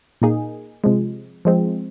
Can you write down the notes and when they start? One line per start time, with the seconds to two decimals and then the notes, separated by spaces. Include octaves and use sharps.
0.22 A#2 A#3 D#4 G#4
0.84 C3 F3 G#3
1.45 F3 G#3 C4